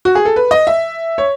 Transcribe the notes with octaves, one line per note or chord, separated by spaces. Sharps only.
F#4
G#4
A4
B4
D#5
E5
C#5